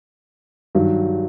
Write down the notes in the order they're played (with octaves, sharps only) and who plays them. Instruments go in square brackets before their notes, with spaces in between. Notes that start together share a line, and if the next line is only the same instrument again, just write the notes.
[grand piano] G2 D#3 F#3